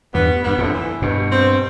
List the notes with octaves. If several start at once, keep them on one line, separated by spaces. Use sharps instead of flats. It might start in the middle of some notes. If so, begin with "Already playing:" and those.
E2 G2 B3
G2 B3
F2 A2 D3
E3
G2 B2
C4